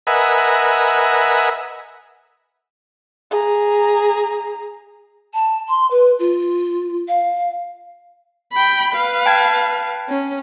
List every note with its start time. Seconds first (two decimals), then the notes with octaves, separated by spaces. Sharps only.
0.07 A#4 B4 D#5 E5 F#5 G#5
3.31 G#4 A#5
5.34 A5
5.68 C6
5.91 B4
6.19 F4
7.08 F5
8.53 G5 B5
8.95 B4 F5
9.26 G5 A5 G#6
10.09 C#4